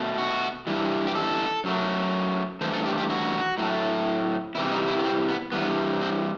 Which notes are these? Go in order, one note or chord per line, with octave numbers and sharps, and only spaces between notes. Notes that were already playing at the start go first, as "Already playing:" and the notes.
Already playing: B2 A3
F#4
G2 E3 G3
G4
A4
F#2 F#3 A3
G2 E3 A3 C5
A4
G4
G4
F#4
A2 F#3 A3
E2 C3 E3 G3 E4
D#4
E4
B3
C4
B3
G2 E3 G3 B3
C4